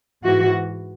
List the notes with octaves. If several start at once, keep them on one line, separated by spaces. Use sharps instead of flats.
G#2 E3 F#4